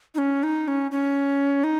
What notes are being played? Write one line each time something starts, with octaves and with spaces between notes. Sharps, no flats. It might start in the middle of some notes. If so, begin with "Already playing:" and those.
D#4
C#4
D#4
C#4
C#4
D#4